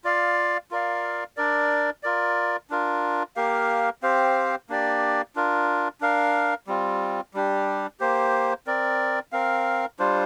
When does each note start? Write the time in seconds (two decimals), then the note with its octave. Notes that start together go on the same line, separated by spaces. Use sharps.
0.04 F4 D5 F5
0.71 F4 A#4 D5 F5
1.37 D4 A#4 D5
2.03 F4 A#4 D5
2.70 D4 F4 A#4
3.36 A#3 G4 A#4 F5
4.03 C4 G4 C5 F5
4.69 A#3 D4 G4 D5
5.36 D4 F4 A#4
6.01 D4 A#4 F5
6.67 G3 C4 F4
7.34 G3 D4 G4
8.00 A#3 G4 C5
8.67 C4 A#4 D5
9.32 C4 A#4 F5
9.99 G3 D4 F4 C5